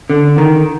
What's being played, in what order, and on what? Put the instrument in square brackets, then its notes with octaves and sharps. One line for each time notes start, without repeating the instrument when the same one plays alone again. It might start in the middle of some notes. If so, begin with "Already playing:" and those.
[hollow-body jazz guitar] D3
D#3